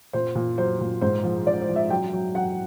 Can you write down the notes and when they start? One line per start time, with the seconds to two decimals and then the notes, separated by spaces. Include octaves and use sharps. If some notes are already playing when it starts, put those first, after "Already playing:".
0.13 A#2 C5
0.35 A#2
0.58 F#3 C5
0.81 A#2
1.02 G#2 C5
1.24 F3
1.46 F3 D5
1.62 C5
1.69 F3
1.76 E5
1.90 F#3 G5
2.13 F#3
2.35 F#3 F#5